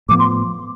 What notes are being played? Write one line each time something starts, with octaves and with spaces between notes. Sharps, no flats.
A2 F3 B3 D6
C6